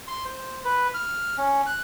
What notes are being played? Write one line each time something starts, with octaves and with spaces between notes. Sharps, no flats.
C6
C5
B4
F6
C#4
F#6